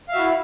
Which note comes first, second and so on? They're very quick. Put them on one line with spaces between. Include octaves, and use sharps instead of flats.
F5 E5 F#4 E4